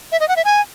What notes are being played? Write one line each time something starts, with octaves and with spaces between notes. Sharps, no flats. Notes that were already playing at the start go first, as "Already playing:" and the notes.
E5
D#5
F#5
E5
G#5